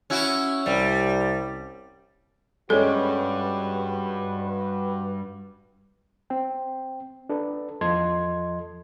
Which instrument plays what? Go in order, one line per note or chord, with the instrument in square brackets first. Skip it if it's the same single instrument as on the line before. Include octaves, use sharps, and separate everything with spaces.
[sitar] C#4 E4 F#4
[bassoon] C2 [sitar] G3
[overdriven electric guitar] G2 G3 [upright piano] G#3 C#4 [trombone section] F#4 B4 [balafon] A4
[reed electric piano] C4 G5
D4 A4 B4
E2 F3 A4 D#5 C6 G#6